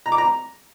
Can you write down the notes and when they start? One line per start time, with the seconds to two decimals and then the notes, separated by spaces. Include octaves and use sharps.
0.06 A#5
0.12 D6
0.18 A#5